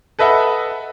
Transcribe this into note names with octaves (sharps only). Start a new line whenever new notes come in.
A4 B4 D#5 E5 F#5